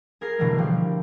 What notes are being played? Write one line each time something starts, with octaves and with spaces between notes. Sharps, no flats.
G#4 A#4 G#6 A#6 C7
B2 D3 E3 G3 A3 A#3
F3 G3 G4